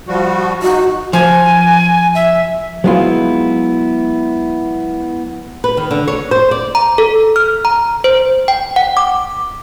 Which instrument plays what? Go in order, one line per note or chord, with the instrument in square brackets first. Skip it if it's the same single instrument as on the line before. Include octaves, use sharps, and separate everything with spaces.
[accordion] F3 G3 F#4
[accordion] D#4 [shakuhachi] F#4
[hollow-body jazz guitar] F3 [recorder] G#5
[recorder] E5
[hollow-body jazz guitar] F#3 G#3 B3 E4 F4
[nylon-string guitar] B4
D#3
D3
C#5
C5
D5
[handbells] A#5
A4
F6
A#5
C5
G5
F#5
D6